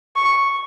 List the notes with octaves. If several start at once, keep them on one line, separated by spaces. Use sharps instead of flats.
C#6